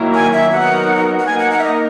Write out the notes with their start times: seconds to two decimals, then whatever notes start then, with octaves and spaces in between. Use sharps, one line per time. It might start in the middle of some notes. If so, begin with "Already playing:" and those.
Already playing: D#3 F#3 A#3 E4 A#4
0.14 G#5
0.33 E5
0.52 F#3 B3 D#4 A#4 F#5
1.19 F#5
1.26 A#3 D#4 A#4 G#5
1.39 F#5
1.51 F#5
1.59 E5
1.64 D#5